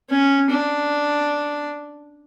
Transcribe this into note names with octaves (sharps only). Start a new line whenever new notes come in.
C#4
D4